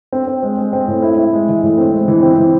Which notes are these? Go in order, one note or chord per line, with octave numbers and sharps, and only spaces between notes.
C4
C4
G#3
G#3
C4
A2
E4
E4
G#3
E3
A2
C4
G#3
E3
C4
E3